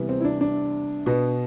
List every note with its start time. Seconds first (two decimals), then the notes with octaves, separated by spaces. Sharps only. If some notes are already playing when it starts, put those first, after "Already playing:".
Already playing: C3 E3 G3 B3
0.09 C4
0.21 E4
0.25 D4
0.41 D4
1.06 B2 B3